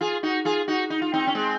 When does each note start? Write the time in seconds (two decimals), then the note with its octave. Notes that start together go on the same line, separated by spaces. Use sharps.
0.01 F4 G#4
0.23 D#4 F#4
0.45 F4 G#4
0.68 D#4 F#4
0.90 D#4
1.02 F4
1.14 C4 D#4
1.27 C#4
1.35 G#3 C4